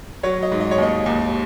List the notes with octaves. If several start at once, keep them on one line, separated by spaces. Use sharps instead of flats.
F#3 C#5
D#5
G#2
D#5
C#5
D#2 D#5
D#2